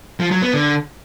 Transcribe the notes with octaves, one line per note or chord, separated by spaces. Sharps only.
F3
F#3
B3
D3